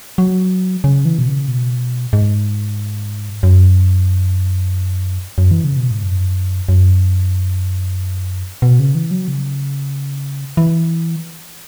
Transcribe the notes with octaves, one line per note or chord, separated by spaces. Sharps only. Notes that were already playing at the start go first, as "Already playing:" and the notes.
F#3
C#3
E3
B2
C#3
B2
G#2
F#2
F#2
E3
C#3
B2
G#2
F#2
F#2
B2
C#3
E3
F#3
C#3
E3